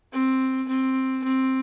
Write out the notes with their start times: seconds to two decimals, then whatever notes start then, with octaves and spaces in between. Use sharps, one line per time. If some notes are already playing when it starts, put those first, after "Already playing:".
0.13 C4
0.68 C4
1.24 C4